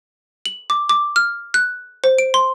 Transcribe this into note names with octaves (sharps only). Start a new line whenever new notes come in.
F#7
D6
D6
F6
F#6
C5
D7
C6